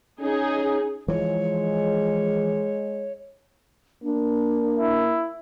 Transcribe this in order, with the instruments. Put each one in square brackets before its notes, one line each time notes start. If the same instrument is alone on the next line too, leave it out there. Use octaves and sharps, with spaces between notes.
[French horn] C#4 [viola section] D#4 G#4
[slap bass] E3 F3 [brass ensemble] G#3 [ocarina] C#5
[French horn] A#3 [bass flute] D4
[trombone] E4